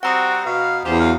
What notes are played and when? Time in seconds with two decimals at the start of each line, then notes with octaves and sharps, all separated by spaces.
0.03 G3 C4 F#4 F#5 A#5 D#6
0.45 B2 F5
0.85 E2 C#4 F4 G4 C5
1.00 F#3 F5